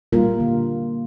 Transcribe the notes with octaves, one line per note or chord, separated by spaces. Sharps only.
A#2 G3 A#3 F4 A#4
D3